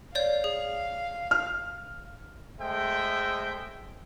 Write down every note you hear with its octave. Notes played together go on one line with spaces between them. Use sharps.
C#5 D5 F5 G6
G#4
F6
G#3 A3 C5 E5 G5